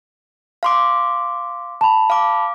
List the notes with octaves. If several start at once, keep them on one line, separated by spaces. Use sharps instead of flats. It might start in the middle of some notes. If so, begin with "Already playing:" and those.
F5 C6 D6
A5 B5
F5 D6